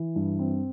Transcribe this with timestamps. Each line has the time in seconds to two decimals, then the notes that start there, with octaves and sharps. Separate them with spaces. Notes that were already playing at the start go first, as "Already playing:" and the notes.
Already playing: E3
0.16 G2
0.39 C4